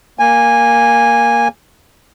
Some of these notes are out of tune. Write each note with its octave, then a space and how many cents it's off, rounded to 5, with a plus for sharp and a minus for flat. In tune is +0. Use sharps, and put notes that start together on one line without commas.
A#3 +0 G#5 -15